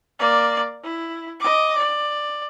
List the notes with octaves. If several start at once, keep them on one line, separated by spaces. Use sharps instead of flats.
A#3 D5
E4
D#5 D6
D5